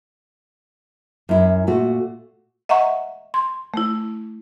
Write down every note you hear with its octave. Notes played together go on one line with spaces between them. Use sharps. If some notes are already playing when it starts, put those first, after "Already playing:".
F#2 E4
A#2 A3 F#4
D#5 E5 F#5 A#5 C#6
C6
A3 E4